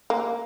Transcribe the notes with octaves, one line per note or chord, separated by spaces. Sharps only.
A#3